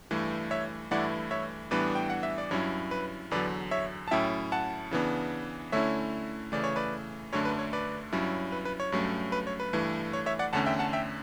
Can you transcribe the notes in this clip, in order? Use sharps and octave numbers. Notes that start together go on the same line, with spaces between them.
G2 E3 A3
C#5 E5
G2 E3 A3 E4 D5 F#5
C#5 E5
A2 E3 G3 B3 D4 B4 D5
G5
F#5
E5
D5
G2 F#3 C#4 E4 C#5
B4
E2 D3 F#3 B4 D5
C#5 E5
A5
A2 F#3 C#4 E4 E5 G5
F#5 A5
C#3 E3 B3 D4
D3 A3 C#4 E4 C#5 E5
C#3 E3 A3 D5
C#5
B4 D5
F#2 D3 A3 D4 C#5
B4
C#5
B4 D5
G2 F#3 C#4 E4
B4
B4
C#5
G2 F#3 A3 C#4
B4
C#5
B4
G2 E3 A3
C#5
C#5 E5
D5 F#5
E2 D3 A3 C#4 F#5 A5
E5 G5
F#5 A5
E5 G5